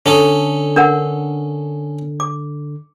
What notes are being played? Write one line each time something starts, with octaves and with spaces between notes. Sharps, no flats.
D3 C#4 A4 D#6
D4 A#4 F#5
D6